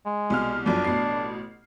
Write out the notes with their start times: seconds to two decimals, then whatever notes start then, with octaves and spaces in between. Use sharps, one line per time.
0.06 G#3
0.30 C2 B2 F6
0.66 G1 F#2 F3 D4
0.84 A1 B2 C7